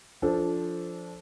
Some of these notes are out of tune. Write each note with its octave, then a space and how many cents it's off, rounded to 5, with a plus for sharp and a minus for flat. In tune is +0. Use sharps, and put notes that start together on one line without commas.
F3 +0 D4 -15 A4 +0